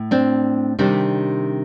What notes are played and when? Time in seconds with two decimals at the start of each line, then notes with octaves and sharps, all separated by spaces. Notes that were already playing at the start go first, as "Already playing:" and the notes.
Already playing: A2
0.11 C4 D4
0.79 C3 D#3 G3 C4 D4